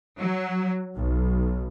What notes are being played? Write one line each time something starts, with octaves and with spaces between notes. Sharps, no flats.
F#3
B1